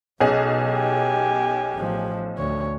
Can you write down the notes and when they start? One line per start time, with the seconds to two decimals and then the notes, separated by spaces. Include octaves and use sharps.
0.20 B1 B2 C#4 G#4
0.70 G4 G#5
1.73 A1 F3
2.38 D2 C#5